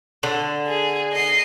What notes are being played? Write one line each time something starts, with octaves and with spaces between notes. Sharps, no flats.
D3
G#4
D#5 C7